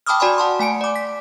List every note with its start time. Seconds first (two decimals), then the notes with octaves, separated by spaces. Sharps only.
0.07 G5 A5 B5 D6 D#6 F6
0.20 F#4 D5 G#5 B5 C6
0.38 F#5 A5 C6
0.59 A3 G#5 C#7 D7
0.81 D5 D6
0.96 B6